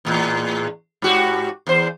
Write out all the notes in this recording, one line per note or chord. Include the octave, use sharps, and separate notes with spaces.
E2 A2
G#2 F#4 G4
E2 C5